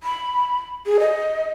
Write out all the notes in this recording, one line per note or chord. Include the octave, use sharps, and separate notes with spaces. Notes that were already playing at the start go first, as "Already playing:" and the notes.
B5
G#4
D#5